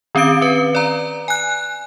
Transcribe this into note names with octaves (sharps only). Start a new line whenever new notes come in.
D#3 C4 C#4 F5 D7
C4 B4
D5 A#5
G#5 F#6